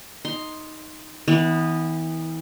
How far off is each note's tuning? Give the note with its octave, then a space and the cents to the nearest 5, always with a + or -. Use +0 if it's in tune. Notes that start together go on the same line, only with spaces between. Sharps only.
D#4 +0 C6 +5
E3 -35 B3 +0